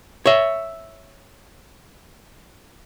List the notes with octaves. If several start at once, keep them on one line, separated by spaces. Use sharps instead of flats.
C#5 E5